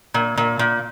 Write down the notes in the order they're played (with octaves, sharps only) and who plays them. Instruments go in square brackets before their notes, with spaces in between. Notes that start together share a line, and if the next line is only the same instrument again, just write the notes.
[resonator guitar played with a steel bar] A#2
A#2
A#2